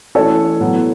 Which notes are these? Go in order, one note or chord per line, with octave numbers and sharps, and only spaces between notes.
E3 A3 C#4 F#4 A4 C#5
A2 F#3 B3